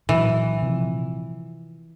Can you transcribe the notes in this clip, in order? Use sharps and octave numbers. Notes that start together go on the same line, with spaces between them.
A#2 E3 F#3
C3 F3